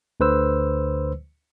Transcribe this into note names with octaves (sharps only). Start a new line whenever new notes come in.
D2 D3 B4 C5 E6